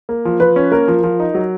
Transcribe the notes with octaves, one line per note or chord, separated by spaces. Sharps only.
A#3
F3
F3 B4
C#4
A#3 A#4
F3
F3
D#4
F#3